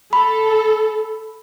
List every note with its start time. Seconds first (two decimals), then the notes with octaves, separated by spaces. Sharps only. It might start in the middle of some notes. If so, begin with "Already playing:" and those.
0.13 A4 B5